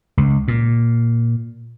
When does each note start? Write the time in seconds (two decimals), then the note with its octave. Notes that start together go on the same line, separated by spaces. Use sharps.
0.17 C#2
0.48 A#2